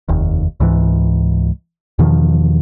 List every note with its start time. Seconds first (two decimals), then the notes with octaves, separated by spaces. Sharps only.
0.08 F1 D#2
0.60 C#2 G#2 E3
1.99 E2 B2 D#3 F3